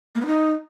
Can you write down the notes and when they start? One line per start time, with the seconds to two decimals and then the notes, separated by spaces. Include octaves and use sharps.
0.15 A#3
0.21 B3
0.26 D#4